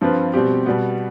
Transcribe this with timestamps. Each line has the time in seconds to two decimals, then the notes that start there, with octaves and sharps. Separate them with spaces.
0.01 G2 F3 C4 F4 B4
0.34 B2 G3 C4 G4
0.66 B2 G3 B3